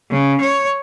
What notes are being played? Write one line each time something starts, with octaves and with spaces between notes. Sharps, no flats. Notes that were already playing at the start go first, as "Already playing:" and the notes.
C#3
C#5